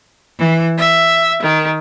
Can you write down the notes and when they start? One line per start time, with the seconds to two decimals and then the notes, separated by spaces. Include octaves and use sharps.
0.39 E3
0.78 E5
1.42 D#3